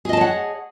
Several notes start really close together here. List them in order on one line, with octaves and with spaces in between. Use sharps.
G#4 D#5 A5 C#5 F#5